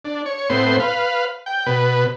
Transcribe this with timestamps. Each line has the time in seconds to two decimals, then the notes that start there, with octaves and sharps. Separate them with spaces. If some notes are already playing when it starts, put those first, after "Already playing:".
0.05 D4
0.26 C#5
0.50 A2 B3 C4 C6
0.80 B4 F5
1.46 G5
1.66 B2 B4